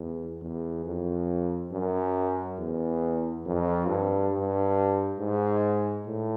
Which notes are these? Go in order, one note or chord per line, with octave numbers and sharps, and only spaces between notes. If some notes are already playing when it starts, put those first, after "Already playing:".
Already playing: E2
E2
F2
F#2
E2
F2
G2
G2
G#2
A2